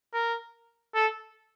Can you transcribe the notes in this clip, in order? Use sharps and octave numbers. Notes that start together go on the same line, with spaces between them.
A#4
A4